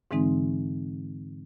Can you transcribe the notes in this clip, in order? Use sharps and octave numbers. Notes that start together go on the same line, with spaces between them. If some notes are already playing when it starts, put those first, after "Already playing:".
G#2 D3 E3 G#3 C4 D#4